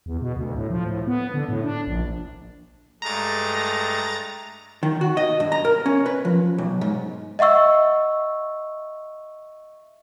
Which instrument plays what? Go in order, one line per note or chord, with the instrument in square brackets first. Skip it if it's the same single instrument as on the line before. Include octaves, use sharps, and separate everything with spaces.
[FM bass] E2
B2
D2
A2
F3
A2
B3
D3
A2
D4
A#1
[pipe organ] G2 G#3 A3 [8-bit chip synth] A#5 A6
[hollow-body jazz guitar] D#3
F#4
D#5
G2
A#5
A#4
C#4
B4
F3
B1
G#2
[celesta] D#5 E5 F#5 C#6 E6